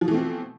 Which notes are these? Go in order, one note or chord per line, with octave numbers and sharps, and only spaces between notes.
B2 E3 F3 A3 C4